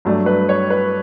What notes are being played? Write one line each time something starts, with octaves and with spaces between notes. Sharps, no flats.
G2 F#3 A3 D4
B4
C#5
B4